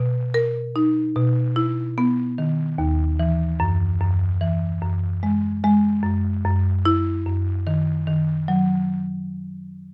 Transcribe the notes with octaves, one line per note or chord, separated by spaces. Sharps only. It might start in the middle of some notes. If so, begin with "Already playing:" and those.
Already playing: B2
A#4
D#4
B2
E4
B3
D#3
D#2
E3
F#2
F#2
E3
F#2
G#3
G#3
F#2
F#2
E4
F#2
D#3
D#3
F#3